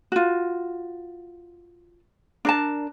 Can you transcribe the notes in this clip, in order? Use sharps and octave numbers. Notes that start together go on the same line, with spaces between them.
F4 F#4
D4 A#4 A5